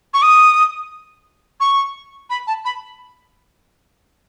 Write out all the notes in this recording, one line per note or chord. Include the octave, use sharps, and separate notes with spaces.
C#6
D#6
C#6
B5
A5
B5